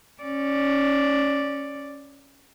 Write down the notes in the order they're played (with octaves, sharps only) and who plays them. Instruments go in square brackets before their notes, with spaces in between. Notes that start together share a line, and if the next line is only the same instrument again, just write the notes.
[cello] C#4 D5